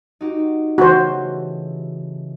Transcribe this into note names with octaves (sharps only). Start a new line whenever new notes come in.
D#4 F#4 G4
C#3 E3 A3 F#4 C5